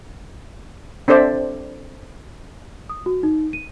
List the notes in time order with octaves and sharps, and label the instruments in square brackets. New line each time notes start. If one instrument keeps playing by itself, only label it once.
[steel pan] C4 D4 A4 C5 D5 E5
[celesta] D#6
F#4
D#4
D#7